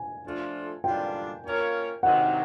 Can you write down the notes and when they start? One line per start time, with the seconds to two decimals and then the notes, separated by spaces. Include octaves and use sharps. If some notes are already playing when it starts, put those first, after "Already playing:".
Already playing: G#5
0.24 F3 A3 D4 F4 A4
0.84 D3 G3 A#3 D4 F4 G5
1.44 A#3 C#4 F4 A#4 C#5
2.03 C3 D#3 F#3 F#5